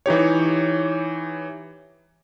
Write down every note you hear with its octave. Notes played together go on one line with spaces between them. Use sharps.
E3 D#4 G4 C#5